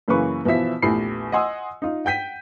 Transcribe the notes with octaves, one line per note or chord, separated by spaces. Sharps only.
F#2 C#3 E3 A#3 B4 C#6
B2 E3 F3 E5 B6
A#1 E2 A3 G4 B5 C7
D#5 F#5 G#5 C6 D#6 E6
D#4 F4
F#5 G5 G6 B6 D#7